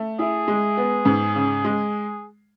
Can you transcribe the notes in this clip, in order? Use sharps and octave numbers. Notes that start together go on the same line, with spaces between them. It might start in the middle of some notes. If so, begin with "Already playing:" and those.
Already playing: A3
E4 G#4
G#3
B3
G#2
C#3
G#3